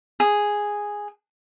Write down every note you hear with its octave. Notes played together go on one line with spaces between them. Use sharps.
G#4